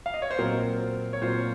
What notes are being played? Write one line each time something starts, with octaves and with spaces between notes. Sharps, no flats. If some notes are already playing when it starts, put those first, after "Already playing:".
F5
D#5
C#5
C5
A#2 F#3 C4 F4 A#4
C#5
A#2 F#3 C4 F4 C5